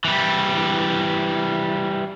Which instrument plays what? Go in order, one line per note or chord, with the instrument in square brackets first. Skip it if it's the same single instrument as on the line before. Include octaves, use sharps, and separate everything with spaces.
[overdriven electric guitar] E3 G3